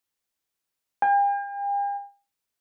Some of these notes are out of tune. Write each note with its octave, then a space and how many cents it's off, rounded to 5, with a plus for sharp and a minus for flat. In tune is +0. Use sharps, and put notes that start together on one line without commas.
G5 +45